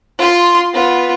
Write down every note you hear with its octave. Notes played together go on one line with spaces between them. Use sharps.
F4 C6
B3 F4